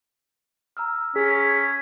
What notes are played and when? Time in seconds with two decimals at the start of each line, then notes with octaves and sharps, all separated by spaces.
0.77 A#5 E6 F6
1.16 C#4 G#4 B6